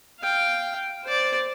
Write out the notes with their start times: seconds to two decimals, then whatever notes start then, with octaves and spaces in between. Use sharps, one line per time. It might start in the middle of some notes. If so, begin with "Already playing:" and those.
0.20 F5 G5
1.04 C5 D5